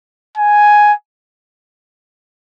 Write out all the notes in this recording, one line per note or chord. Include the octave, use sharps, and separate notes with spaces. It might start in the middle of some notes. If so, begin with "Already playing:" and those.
G#5